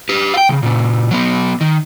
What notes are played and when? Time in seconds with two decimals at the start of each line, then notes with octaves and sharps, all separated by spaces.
0.09 G4 B4
0.34 F5 G5
0.49 C2 C#3
0.63 A#2 C#3
1.11 F#3 B3
1.61 D#3